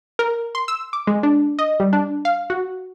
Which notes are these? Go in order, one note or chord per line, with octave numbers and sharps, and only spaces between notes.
A#4
C6
E6
D6
G#3
D4
D#5
G3
D4
F5
F#4